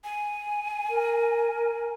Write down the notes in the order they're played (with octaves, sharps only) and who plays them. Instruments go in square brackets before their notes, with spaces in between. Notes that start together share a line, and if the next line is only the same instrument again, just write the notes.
[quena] G#5
[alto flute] A#4